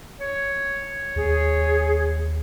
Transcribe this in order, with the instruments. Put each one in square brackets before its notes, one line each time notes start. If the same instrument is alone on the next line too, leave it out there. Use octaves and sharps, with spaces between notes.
[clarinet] C#5
[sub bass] D#2 [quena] G#4